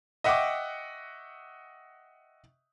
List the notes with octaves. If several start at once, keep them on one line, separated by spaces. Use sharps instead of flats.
D#5 E5 F#5 G5 C#6 D6